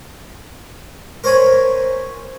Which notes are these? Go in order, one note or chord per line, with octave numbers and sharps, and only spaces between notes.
A#4 C5 C#5 G#5 B5